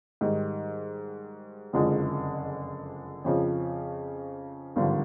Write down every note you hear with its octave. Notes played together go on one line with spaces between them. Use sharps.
G#2 D#3 G3
F#1 F2 D3 F3 G#3
F2 C#3 F3
G#1 G2 D3 F3